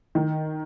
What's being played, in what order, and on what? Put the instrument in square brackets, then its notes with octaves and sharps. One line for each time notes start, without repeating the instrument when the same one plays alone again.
[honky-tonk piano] D#3